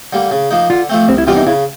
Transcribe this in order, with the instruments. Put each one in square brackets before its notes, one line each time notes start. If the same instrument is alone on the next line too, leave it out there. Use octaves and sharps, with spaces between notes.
[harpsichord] D3 G3 A#3
C#3
F3 A#3 D#4
[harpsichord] D3 [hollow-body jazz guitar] F4
[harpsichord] F3 A3 C4
[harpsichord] C2 [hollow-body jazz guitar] C4
[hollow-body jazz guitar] E4
[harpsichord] C3 E3 G3 B3 [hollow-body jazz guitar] F4
[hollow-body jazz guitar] D#4
[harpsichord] C#3 [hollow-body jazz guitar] E4